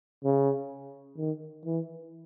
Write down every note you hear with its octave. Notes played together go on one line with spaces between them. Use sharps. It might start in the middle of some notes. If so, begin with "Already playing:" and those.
C#3
D#3
E3